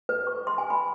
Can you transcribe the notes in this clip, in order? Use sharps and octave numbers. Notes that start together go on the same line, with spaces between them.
B4
C#6
C6
G#5
B5